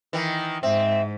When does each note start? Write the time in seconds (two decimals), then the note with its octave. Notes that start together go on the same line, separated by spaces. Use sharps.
0.13 D#3 E3
0.63 G#2 C4 E5